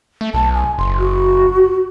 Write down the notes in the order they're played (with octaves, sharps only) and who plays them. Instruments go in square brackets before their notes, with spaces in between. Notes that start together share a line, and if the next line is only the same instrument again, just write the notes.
[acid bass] A3
[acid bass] B1 [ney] A5
[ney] G#5
[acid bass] F#1 [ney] C6
[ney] F#4